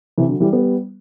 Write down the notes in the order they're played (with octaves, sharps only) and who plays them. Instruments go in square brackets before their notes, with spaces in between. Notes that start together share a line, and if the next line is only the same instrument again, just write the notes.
[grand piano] C3 E3
D3 F#3
E3 G3
G3 B3